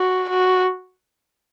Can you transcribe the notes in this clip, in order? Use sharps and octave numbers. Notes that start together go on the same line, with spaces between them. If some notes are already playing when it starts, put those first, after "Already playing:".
Already playing: F#4
F#4